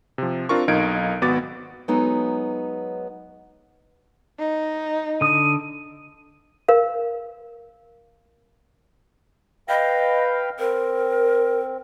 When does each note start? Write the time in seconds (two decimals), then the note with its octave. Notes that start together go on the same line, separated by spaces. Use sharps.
0.18 C3 F3
0.49 C4 D4 F4 A#4 C#6
0.68 B1 D#4 A#4 F5 G#6 D7
1.22 G#1 B3 F#4 D6 A6
1.88 F#3 G#3 B3 D#4 A4 C#5
4.39 D#4
5.21 D3 D#6 D#7
6.68 A#4 F5
9.69 B4 D#5 F5 G5
10.59 C4 A#4